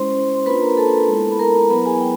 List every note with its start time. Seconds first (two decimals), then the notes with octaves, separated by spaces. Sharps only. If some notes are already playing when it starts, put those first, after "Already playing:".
Already playing: G#3 C#4 E4 C5 C6
0.36 C6
0.46 A#3 D4 F4 B4 B5
0.61 A#4 A#5
0.77 A4 A5
1.08 G#3 B3 E4
1.31 B5
1.39 A#4 A#5
1.70 F#3 B3 E4 B4 B5
1.86 G#4 G#5
2.01 G5